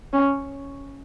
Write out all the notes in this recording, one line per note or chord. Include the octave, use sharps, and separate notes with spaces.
C#4